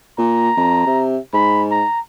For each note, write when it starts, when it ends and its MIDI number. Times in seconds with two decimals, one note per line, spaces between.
0.18 0.50 46
0.18 1.05 82
0.57 0.87 41
0.87 1.18 48
1.34 1.83 44
1.34 1.63 83
1.71 2.00 82